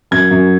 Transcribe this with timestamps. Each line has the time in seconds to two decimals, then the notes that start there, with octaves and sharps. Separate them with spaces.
0.11 F#2 G#6
0.31 F#2